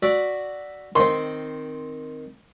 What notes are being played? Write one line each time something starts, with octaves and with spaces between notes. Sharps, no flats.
F#4 D5 E5
D#3 C4 C6